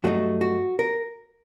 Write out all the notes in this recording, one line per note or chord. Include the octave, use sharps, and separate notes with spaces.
G2 F#3 A3 C4 D#4 F#4
F#4
A#4